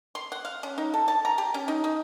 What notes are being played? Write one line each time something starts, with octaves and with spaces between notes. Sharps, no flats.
C6
F#5
F5
C#4
D#4
A4
A5
A#5
G4
C#4
D#4
D#4